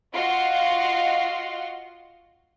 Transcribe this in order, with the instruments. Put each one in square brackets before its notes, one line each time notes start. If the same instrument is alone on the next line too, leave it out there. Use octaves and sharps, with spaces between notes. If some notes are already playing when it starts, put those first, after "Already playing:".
[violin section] F4 F#4 D#5 F5 F#5 C6